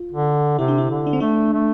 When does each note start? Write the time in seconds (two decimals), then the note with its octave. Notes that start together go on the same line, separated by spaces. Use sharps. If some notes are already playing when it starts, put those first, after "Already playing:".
Already playing: F4
0.12 D3
0.58 C3 E4
0.68 D4
0.78 E4
0.90 D3
1.07 D4
1.13 C4
1.20 A3 D4
1.53 A3